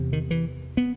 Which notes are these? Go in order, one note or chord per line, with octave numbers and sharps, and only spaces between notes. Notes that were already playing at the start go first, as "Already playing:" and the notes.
Already playing: E2 C3
D#3
E3
B3